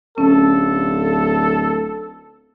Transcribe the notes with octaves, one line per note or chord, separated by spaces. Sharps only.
D1 C#4 A4